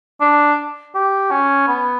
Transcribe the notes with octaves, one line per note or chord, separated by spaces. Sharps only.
D4
G4
C#4
B3